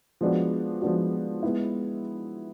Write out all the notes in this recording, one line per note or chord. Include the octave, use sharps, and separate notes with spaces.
F3 G#3 B3 D4 F#4
F3 G#3 B3 D4 F#4
G#3 B3 E4